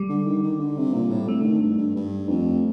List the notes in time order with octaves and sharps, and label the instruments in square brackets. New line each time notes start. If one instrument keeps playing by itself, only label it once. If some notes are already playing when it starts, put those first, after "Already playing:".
Already playing: [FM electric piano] G3
[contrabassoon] D3
D#3
D#3
D3
C3
A#2
A2
[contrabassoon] C3 [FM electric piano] A3
[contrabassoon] D3
D#3
G2
G2
G2
F2